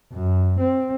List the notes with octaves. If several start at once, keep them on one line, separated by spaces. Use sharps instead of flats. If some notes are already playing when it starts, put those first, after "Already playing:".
F#2
C4